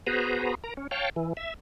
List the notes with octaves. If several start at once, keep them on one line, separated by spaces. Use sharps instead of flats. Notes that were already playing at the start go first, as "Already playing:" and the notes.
B3 F#4 G#4 B4 C5 A#5
A#4 A#5
C#4
C#5 F5 G5 A5
E3
E5